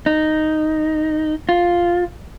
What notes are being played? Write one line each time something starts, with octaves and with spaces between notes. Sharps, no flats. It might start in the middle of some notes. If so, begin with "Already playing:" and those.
D#4
F4